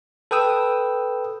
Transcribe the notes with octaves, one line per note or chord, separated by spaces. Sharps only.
A4 B4 G5 D#6 E6